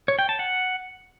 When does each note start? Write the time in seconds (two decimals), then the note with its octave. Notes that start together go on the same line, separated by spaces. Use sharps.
0.08 C#5
0.19 G5
0.29 A5
0.39 F#5